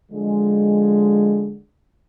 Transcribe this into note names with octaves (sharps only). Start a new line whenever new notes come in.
D3 F3 G#3